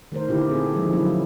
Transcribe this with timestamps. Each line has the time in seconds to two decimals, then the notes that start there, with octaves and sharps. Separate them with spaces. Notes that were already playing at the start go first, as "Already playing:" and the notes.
0.12 D#3 A3 A#4 C5
0.29 A#2 D3 A#3 E4 G4
0.49 C4 G#4 A4
0.75 D#3 F3 G#3 A#3 D#4
0.93 D3 F#3 A#3 C#4 E4